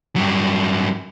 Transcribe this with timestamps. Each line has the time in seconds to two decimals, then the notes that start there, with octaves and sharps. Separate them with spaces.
0.16 G2 F#3